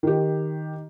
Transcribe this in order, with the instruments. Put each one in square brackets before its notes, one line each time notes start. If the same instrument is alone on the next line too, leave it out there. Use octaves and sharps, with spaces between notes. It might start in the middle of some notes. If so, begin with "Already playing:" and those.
[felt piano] D#3 G4